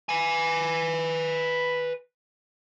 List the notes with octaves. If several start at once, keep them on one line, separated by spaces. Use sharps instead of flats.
B4 G#5